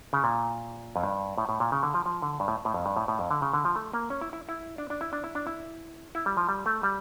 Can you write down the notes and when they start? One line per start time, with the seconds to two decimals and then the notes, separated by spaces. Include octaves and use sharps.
0.13 C#3
0.24 A#2
0.96 F2
1.04 G2
1.38 A2
1.49 A2
1.60 A#2
1.72 C#3
1.83 D3
1.94 F3
2.06 F3
2.22 D3
2.40 G2
2.48 A2
2.65 A2
2.74 F2
2.86 G2
2.96 A2
3.08 A2
3.19 F2
3.31 D3
3.42 C#3
3.53 D3
3.65 F3
3.76 A3
3.94 A#3
4.10 C#4
4.22 E4
4.33 E4
4.49 E4
4.78 D4
4.90 D4
5.01 E4
5.13 D4
5.24 E4
5.35 D4
5.47 E4
6.15 E4
6.26 G3
6.37 F3
6.49 G3
6.66 A3
6.83 G3